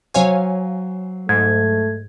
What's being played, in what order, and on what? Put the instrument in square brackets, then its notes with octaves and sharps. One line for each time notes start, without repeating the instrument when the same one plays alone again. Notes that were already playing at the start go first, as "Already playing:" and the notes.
[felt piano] F#3 C5 [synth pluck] C#5 F5 G#5
[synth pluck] G#2 [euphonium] A3 [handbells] G#6